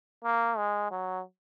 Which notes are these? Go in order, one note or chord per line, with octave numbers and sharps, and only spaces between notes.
A#3
G#3
F#3